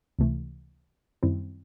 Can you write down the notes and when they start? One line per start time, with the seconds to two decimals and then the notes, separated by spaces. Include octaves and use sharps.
0.19 C#2 C3 E3 A3
1.23 F#2 D#3 G3 C4 E4